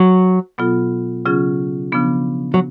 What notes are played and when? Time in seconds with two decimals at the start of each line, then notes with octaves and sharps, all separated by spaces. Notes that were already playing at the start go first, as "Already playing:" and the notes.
Already playing: F#3
0.58 B2 F#3 B3 F4 A4
1.25 C#3 F#3 C#4 F4 G#4
1.92 C#3 F3 B3 D4
2.54 F#3